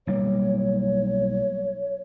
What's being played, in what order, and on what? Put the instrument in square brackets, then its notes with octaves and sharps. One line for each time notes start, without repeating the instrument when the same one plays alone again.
[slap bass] B1 G3 A#3 [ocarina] C#5